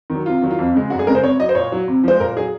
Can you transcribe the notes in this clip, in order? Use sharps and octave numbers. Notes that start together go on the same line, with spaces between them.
D#3
F#3
C3 F4
D#3 F#3
F4
F2
C#3 G#3
F#2 F#4
G#4
C#3 G#3 A#4
C5
C3 C#5
F#3 D#5
C5
A#2 C#5
F#3
C3
F3 G#3 C5
A#2 A#4
F#3 G#4